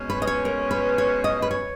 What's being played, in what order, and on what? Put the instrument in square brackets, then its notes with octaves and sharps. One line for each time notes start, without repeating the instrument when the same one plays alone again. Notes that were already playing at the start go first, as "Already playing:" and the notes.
Already playing: [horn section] B2 G#3 C#4
[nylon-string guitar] B4
D#5
C#5
A#4
B4
C#5
D#5
B4
C#5